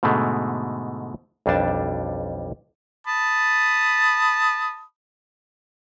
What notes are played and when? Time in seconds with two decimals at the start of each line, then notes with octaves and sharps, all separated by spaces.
0.03 G#2 B2 D3 G#3 A3
1.46 B1 F2 G3 D4 A5
3.07 A5 B5 D#6